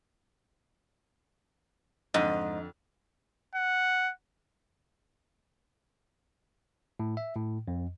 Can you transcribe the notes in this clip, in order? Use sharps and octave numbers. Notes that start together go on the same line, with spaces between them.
F2 G#2 D3 D#5
F#5
A2
E5
A2
F2